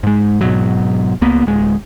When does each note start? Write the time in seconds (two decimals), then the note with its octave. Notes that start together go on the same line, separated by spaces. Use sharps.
0.03 G#2 G#3
0.41 G#2 B2 F#3
1.22 C#2 A#3 B3
1.45 D1 G#3